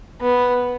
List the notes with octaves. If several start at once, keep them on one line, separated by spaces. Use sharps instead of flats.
B3